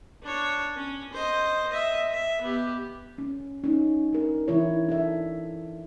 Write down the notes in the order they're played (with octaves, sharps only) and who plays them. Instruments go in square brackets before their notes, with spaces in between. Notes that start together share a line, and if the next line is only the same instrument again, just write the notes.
[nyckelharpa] D4 C#5
C#4
C5 D#5
D#5 E5
E5
B3 G4
[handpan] C#4
C#4 D#4
D4 A#4
E3 E4 C#5
D4 A4 E5